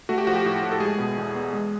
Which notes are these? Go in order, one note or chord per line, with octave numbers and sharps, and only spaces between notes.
A3 F#4
G4
F3 F#4
G4
A2
A2
A4
G#3 G#4
B2
E2
E2
G#3